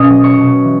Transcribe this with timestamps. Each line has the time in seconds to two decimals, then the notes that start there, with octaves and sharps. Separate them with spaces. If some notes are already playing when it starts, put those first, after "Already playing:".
Already playing: B2 C#4 D#5 D#6
0.10 F#3
0.23 C#5 C#6
0.38 B2
0.64 E3